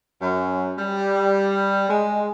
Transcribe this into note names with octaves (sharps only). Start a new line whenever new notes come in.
F#2
G3
G#3